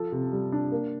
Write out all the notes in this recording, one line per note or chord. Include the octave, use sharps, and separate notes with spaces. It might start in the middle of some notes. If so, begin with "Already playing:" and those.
Already playing: F3 A4
C3
G3
D4
A#3